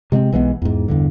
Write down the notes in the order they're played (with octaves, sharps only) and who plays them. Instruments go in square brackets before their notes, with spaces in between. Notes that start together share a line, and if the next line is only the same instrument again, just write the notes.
[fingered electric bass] C3 G#3 A#3 C4
B1 E3 G#3 B3
E2 G#2
E2 G2 D3